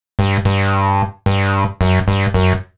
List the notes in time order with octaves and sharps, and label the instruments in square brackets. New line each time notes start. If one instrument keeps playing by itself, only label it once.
[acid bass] G2
G2
G2
F#2
G2
F#2